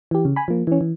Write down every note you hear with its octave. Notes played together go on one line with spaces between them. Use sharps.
E3 G4
C#3
G#5 B5
F3 A#3
E3 C#4
E3